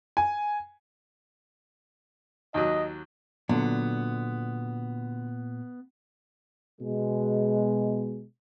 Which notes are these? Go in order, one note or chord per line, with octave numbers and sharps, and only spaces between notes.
G#5
D#2 F#3 D#5
A#2 D3 F#3 B3
B2 G#3